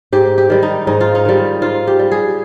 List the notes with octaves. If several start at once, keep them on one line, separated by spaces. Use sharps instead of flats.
G#2 G4
G4
D#3 G3
D#4
G#2 D#4
F4
D#4
D#3 G3
G#2 F4
G4
G3
G#4